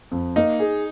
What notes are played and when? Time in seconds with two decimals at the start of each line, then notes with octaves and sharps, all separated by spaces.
0.11 F2
0.36 A#3 D#4
0.59 G#4